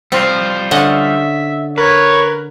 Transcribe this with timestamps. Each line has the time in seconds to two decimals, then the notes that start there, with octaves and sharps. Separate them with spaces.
0.12 G3 C4 F4 C5
0.71 D3 C#4 D#5 E5
1.78 A#4 B4 C#5